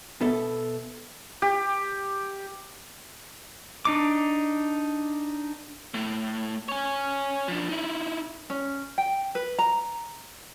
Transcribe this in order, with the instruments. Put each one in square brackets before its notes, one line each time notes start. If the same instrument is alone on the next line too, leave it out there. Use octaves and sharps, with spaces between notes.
[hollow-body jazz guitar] B2 B3 A4 E5
[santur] G4
[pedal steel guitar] D4 D#4 D6
[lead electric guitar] A2 A3
C#5 G#5
F3 D4
D#4 E4
[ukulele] C#4
G5
B4
A#5